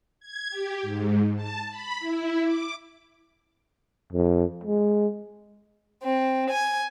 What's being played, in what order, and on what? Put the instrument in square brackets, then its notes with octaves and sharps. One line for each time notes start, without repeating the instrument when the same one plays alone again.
[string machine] G#6
G4
G#2
A5
B5
E4
D6
[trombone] F2
G#3
[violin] C4
G#5